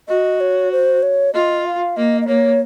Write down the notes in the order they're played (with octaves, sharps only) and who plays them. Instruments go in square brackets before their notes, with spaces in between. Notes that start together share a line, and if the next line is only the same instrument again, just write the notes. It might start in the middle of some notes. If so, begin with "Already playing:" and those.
[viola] F#4 [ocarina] D#5
[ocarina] C#5
C5
C#5
[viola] F4 [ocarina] D#5
[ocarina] F5
[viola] A#3 [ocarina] D#5
[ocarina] D#5
[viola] A#3 [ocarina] C#5